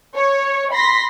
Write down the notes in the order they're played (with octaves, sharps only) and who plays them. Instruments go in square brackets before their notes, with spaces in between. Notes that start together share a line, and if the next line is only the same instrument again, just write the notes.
[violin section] C#5
B5 C6 A#6 B6